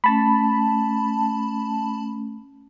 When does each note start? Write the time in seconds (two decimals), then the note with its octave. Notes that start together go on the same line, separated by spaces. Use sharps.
0.04 A3 C#4 A5 B5